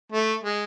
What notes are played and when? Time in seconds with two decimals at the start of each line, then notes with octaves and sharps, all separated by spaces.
0.12 A3
0.43 G#3